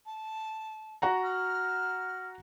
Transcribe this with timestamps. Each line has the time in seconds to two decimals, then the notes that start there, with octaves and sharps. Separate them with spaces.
0.06 A5
1.02 F#4 F#5 A#5
1.24 F6